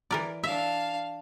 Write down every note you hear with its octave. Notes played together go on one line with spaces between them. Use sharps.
E3 A#4 D5
D4 E5 F5